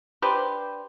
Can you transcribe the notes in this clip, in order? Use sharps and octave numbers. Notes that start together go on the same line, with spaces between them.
D4 G4 B4 C5